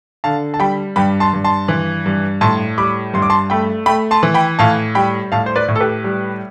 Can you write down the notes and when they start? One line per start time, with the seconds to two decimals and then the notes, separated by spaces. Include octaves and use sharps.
0.24 D3 F5 A5
0.54 A5
0.60 G3 G5 B5
0.96 G2 G5 B5
1.20 A5 C6
1.33 G2
1.44 A5 C6
1.68 E3
2.06 G2
2.41 A2 A5 C6
2.78 G3 B5 D6
3.14 G2 C6
3.22 D6
3.30 A5 C6
3.50 A3 G5 B5
3.86 A3 G5 B5
4.11 A5 C6
4.23 E3
4.34 G5 B5
4.59 A2 F5 A5
4.95 G3 G5 B5
5.32 A2 F5 A5
5.46 C5
5.56 B4 D5
5.68 A2
5.76 A4
5.80 G4 B4
6.04 G3